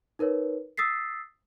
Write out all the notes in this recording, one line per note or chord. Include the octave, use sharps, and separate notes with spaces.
D#4 A#4 B4 C#5
D#6 E6 A6 B6 C7